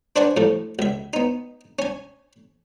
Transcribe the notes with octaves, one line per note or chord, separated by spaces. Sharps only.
D4 B4 C5 D5 F#5 G#5
A2 F3 A3
C#2 E5
B3 D#4
C#4 G#5